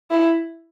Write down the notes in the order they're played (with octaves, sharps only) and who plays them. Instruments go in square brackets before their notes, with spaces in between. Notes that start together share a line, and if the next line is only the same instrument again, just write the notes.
[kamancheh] E4